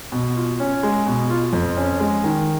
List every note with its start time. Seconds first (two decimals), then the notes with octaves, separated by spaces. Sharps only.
0.12 B2
0.36 F4
0.60 C#4
0.83 G#3
1.07 B2
1.30 F4
1.53 F2
1.77 C#4
2.00 G#3
2.24 D#3